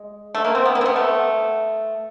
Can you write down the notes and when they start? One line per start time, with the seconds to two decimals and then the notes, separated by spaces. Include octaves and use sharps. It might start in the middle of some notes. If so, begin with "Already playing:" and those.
Already playing: G#3
0.35 A3
0.45 A#3
0.55 C4
0.65 B3
0.75 A#3
0.81 C4
0.86 B3
0.96 A3